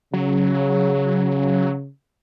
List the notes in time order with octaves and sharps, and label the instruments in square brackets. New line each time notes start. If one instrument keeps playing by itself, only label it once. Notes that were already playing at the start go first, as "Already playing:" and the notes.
[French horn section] C#3 [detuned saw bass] F#3